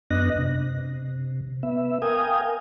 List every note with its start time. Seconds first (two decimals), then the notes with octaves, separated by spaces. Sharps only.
0.11 F#2 B3 D4 D#5 F#6 A#6
0.38 C3
1.63 B3 E5
2.02 A#4 F5 G5 G#5 D#6